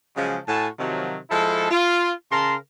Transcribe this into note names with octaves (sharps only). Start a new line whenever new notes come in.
C#3 F3 F#3 G#3
A2 F#4 G#5 A5
C3 D#3 F3 F#3
F3 G#3 E4 A4
F4
C#3 A#4 A5 A#5 C6